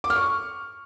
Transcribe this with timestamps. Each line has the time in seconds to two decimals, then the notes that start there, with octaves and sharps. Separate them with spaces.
0.04 D6
0.10 F6
0.16 C#6